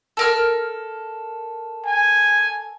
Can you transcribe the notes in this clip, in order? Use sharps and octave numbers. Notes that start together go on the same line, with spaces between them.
A4 A#4 F6
G#5